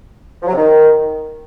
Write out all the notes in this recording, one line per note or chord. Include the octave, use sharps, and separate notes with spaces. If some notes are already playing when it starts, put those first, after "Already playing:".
F3
F#3
C3
D#3